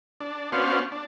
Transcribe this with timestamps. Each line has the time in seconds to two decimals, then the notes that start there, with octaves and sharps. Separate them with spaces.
0.21 D4
0.52 B3 C#4 D4 F#4 C5 F5
0.92 D4